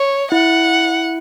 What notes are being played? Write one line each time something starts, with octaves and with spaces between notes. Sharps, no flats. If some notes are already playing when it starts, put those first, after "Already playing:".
Already playing: C#5
E4 F#5